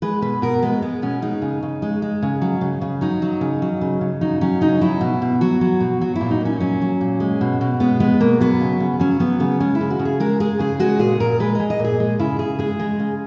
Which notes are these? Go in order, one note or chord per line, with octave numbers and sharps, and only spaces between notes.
G#3 B4
B2 B4
B2 A#4
G#3 B3
G#3 B3
B2 C#4
G#3 D#4
C#3
C#3
G#3
G#3
C#3
F#3
C#3
C#3
F#3 D#4
F#3
C#3
F#3
C#3
C#3
F#3 D#4
F#3 C#4
C#3 D#4
F#3 E4
B2
B2
F#3 F#4
F#3
B2
F#3 F#4
E4
A#2
D#4
A#2 C#4
F#3 C#4
F#3
A#2
G#3
B2
B2
G#3 B3
G#3 B3
B2 A#3
F#3 B3
C#3
C#3
F#3 C#4
F#3 B3
C#3 B3
G#3 C#4
E4
C#3
F#4
C#3
G#4
G#3 A#4
G#3 G#4
C#3 G#4
G#3 F#4
A#2 G#4
A#2 A#4
G#3 B4
G#3 D#5
D#5
A#2
G#4
G#3
C#3 E4
C#3 G#4
G#3 G#4
G#3
C#3